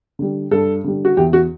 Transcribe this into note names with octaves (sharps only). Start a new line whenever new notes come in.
D3 G3
G2 A4
D3 G3
F#4
E2 G4
F#4